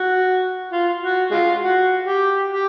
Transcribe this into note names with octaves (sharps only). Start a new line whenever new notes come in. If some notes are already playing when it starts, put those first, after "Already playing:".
Already playing: F#4
F4
F#4
G#3 F4
F#4
G4
G4